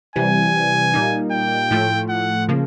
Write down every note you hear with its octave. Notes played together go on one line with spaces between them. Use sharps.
C3 E3 G3 G#5
A#2 G3 A#3 D#4
G5
A2 F3 A3
F#5
C#3 F3 A#3